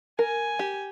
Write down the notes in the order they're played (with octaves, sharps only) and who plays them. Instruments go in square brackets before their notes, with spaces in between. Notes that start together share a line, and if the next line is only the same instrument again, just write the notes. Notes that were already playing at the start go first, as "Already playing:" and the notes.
[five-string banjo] A#4 [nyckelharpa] G#5
[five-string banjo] G4